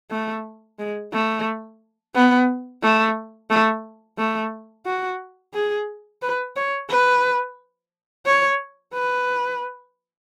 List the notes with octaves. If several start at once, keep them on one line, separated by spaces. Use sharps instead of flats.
A3
G#3
A3
B3
A3
A3
A3
F#4
G#4
B4
C#5
B4
C#5
B4